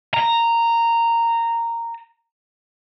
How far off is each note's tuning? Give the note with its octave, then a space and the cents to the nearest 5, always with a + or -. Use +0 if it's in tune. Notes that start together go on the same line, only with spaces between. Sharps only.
A#5 -10